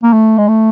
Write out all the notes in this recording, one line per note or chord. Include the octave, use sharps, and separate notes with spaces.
A#3
A3
G#3
A3